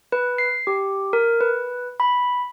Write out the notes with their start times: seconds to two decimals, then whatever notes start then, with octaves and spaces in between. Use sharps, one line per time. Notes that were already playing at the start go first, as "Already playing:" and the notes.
0.12 B4
0.38 C7
0.67 G4
1.13 A#4
1.41 B4
2.00 B5